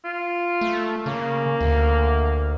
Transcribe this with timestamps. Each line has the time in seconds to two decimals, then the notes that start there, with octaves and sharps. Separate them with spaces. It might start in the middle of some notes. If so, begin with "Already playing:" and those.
0.05 F4
0.61 A3
1.06 C#3 A#3
1.61 D2